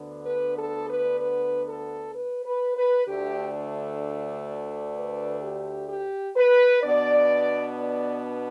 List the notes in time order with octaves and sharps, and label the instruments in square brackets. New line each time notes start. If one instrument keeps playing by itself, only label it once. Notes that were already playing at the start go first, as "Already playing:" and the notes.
Already playing: [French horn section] D2 D3 B3 D4
B4
A4
B4
B4
A4
B4
B4
B4
D2 D3 A3 D4 G4
B4
G4
G4
B4
B2 B3 D4 D5
D5